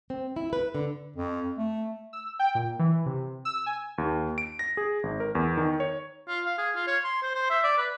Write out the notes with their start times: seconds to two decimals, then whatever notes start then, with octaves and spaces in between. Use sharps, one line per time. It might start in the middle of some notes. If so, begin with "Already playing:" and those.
0.10 C4
0.36 E4
0.53 B4
0.75 D3
1.16 F2
1.58 A3
2.13 E6
2.39 G5
2.55 A#2
2.79 E3
3.06 C3
3.45 E6
3.66 G#5
3.98 D#2
4.38 D7
4.59 A#6
4.77 G#4
5.03 G#1
5.20 A#4
5.35 E2
5.57 D#3
5.80 C#5
6.28 F4
6.45 F5
6.58 G#4
6.76 F4
6.87 C#5
7.04 C6
7.23 C5
7.35 C5
7.50 E5
7.64 D5
7.78 B4